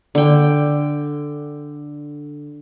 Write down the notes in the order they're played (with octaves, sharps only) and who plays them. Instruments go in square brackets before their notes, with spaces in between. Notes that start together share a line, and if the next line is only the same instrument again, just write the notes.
[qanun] D3 G5